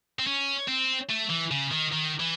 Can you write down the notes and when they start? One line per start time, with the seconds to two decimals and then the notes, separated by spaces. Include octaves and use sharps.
0.19 C4
0.27 C#4
0.68 C4
1.10 A3
1.30 E3
1.51 C#3
1.71 D#3
1.92 D#3
2.20 E3